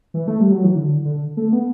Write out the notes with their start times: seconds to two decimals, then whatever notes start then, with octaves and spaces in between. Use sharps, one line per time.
0.14 E3
0.28 A3
0.40 G3
0.52 F#3
0.64 E3
0.76 D3
1.05 D3
1.37 A3
1.52 B3